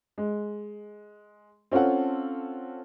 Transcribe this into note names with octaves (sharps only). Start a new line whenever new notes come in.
G#3
C4 C#4 F4 A4 F#5